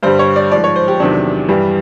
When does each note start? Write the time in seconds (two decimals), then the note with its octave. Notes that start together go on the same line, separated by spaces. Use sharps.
0.03 G2 D3 G3 C5
0.19 C#5
0.36 D5
0.52 G#2 F3 D5
0.64 C#5
0.76 C5
0.88 G4
1.00 E2 C3 D#3 F#3 D4
1.49 G2 E3 G3